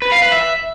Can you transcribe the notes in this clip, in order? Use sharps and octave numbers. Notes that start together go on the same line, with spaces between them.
B4
F5
B4
E5